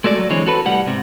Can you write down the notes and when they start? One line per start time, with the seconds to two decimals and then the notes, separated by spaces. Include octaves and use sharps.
0.04 G#3 A3 F#4 D5
0.18 F#3
0.30 D3 E3 G#3 C4 C#5
0.47 F#4 A4 B4
0.65 C2 A2 G3 F#5
0.86 G#2 C3